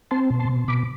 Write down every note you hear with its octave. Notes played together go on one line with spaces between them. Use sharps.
C4 A5 C6
B2
A5 C6
B2
B2 B5 D6